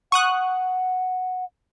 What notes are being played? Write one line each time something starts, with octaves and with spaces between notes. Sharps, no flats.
F#5 C#6 D#6 F#6